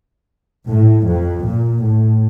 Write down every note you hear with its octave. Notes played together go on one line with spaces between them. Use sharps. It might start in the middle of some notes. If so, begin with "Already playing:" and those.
A2
F2
A#2
A2